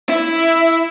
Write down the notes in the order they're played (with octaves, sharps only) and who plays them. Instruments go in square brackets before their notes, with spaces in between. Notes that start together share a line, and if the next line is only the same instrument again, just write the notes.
[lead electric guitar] E4